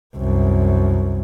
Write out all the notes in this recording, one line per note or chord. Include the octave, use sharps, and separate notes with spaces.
C2 F#2